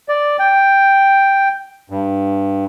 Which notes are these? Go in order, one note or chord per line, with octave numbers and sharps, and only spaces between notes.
D5
G5
G2